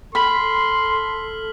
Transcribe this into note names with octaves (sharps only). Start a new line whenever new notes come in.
A4 B5 C6 F6 B6 F#7